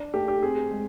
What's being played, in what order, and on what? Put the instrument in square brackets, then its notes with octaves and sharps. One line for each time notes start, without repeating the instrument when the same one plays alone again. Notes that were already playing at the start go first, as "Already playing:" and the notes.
Already playing: [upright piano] D4
A3 G4
G4
C4 G#4
G#3